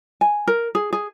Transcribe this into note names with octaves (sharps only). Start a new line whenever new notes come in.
G#5
A#4
G#4
G#4